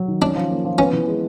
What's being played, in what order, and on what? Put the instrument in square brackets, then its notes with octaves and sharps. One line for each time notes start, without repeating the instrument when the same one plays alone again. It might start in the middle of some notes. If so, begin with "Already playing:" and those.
Already playing: [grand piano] F#3
D#3
[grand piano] C#4 [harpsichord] D4
[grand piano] F3
A#3
F3
[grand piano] B3 [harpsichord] C#4
[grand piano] E3
G#3